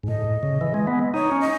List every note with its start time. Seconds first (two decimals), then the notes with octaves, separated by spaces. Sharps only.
0.03 G#2
0.08 A2 D#5
0.43 C#3
0.61 E3
0.74 G#3
0.87 B3
1.13 D#4 C#5
1.32 C#4
1.40 D#5